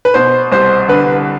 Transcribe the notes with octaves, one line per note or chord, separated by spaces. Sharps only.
B4
B2 C5
C2 C5
D3 B4